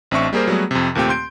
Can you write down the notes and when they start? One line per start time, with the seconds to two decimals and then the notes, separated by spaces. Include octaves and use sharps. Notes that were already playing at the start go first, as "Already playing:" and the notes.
0.11 A1 C4 D4 E5 C#6
0.33 G3 A#3 G#4 A#4 C5
0.47 F#3 G3 A3 B3 F#4 G#4
0.71 F2 C3
0.95 D#2 A#2 A3 C4 G4 G5
1.09 C6 G6 D7